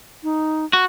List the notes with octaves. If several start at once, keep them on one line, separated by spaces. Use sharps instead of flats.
D#4
F#4